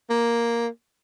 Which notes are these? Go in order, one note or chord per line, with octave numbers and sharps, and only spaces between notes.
A#3